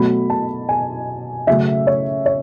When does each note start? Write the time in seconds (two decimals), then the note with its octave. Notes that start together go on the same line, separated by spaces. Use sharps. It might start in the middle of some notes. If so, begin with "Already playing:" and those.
Already playing: B2 F#3 A3 B5
0.30 A5
0.69 G#5
1.47 C#3 F#3 A3 E5
1.87 C#5
2.26 C#5